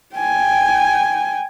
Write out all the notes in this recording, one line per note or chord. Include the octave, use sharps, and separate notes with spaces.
G5 G#5